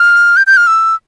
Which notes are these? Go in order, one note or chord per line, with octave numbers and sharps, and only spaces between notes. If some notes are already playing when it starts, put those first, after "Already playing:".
Already playing: F6
G6
G6
F6
E6